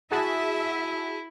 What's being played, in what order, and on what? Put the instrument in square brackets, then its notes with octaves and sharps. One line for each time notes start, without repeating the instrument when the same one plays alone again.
[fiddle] E4 [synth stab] F#4 G#4 A5 [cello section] E5